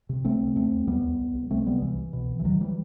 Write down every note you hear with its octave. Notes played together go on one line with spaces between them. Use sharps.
C3
C2 A3 C4
C3
D#2 A3 C4
D#2
D#2 G3 B3
D#2
C2
C2
C3 A3 C4
C3 G3 B3
C2 E3
C2
B2
C2
E3
D#2 D#3 F#3
E3 G3